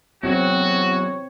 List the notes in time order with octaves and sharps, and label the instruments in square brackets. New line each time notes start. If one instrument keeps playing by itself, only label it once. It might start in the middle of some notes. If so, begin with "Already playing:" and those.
[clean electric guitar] E2 F#3 [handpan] C4 [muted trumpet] F#4 [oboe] C#5